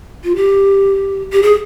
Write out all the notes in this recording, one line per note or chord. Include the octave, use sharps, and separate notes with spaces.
F4
G4
G4
G#4